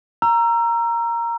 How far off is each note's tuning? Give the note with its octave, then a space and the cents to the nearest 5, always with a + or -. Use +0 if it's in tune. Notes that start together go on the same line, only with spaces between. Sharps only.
A#5 +0 E6 +30